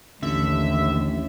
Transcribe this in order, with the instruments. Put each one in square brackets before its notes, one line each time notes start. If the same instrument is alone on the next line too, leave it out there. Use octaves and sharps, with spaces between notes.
[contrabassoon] A1 [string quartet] D#2 [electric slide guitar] D3 [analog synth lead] E5